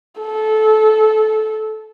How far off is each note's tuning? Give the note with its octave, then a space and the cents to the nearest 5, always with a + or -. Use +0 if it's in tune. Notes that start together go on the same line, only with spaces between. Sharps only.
A4 -20